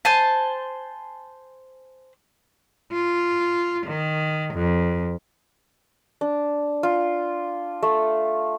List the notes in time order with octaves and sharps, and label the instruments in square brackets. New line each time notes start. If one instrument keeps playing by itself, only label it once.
[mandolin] C5 G#5 A5
[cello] F4
D#3
F2
[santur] D4
F4
A3